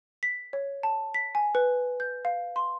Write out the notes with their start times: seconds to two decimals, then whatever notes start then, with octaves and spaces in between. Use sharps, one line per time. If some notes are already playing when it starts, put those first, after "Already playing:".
0.23 B6
0.53 C#5
0.83 A5
1.14 B6
1.35 G#5
1.55 B4
2.00 G6
2.25 F5
2.56 C6